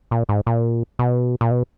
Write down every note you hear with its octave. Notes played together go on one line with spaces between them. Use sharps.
A#2
G#2
A#2
B2
A#2
B2